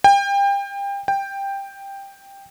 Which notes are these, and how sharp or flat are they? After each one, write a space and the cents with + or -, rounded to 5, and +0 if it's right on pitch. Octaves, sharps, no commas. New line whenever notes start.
G5 +30
G5 +10